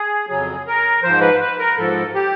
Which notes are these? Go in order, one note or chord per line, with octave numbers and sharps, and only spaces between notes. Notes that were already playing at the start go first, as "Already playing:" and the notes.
Already playing: G#4
F2 C#3 F#3 G#4
A#4
G#2 F3 C5
B4
B4
A#4
G#2 F3 A4
G4